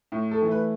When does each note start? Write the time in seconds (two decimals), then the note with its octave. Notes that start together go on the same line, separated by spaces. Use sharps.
0.12 A2
0.31 A4
0.42 E3 A3
0.51 B4